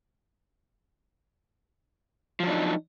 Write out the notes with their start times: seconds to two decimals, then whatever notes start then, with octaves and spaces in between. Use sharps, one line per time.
2.40 F3
2.43 F#3
2.47 D4
2.51 D#4